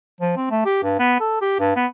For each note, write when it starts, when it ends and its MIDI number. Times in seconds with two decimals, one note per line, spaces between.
0.21 0.33 53
0.37 0.47 60
0.51 0.61 57
0.66 0.83 67
0.83 0.98 43
0.99 1.15 59
1.20 1.39 69
1.42 1.56 67
1.60 1.73 43
1.76 1.86 59